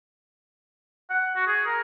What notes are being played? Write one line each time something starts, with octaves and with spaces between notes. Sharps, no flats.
F#5
F#4
G#4
A#4